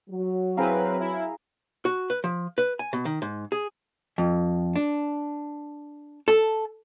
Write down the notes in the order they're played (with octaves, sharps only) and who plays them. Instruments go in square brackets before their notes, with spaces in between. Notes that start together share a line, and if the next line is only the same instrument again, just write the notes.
[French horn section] F#3
[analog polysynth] C4 E4 B4 [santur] G#4 A#4 F5
[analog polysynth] E4
[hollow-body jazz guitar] F#4
B4
F3
B4
G#5
B2
D#3
G#2
G#4
F2
D4
A4